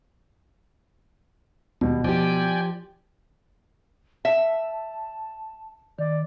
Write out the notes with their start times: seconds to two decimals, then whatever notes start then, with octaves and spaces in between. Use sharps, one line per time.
1.81 D#2 B2 G3
2.04 F3 G4 D5 G5 G#5
4.25 E5 A5
5.99 D#3 D5